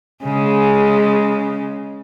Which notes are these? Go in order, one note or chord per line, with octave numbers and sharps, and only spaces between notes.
C#3 G#3